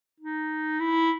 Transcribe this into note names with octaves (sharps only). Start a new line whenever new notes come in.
D#4
E4